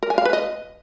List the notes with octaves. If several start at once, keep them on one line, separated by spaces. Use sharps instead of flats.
A#4
G#5
F5
B4
D#5